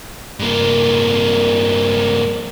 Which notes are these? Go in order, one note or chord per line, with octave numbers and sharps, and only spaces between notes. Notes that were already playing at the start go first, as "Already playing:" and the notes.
G2 A#3